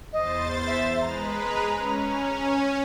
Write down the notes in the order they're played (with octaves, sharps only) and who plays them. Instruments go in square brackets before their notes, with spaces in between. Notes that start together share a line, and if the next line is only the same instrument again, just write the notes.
[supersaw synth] E2 C5 A6 [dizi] D#5
[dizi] E5
[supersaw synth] G#3 B4 [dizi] A#5
[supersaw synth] C#4
[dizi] G#5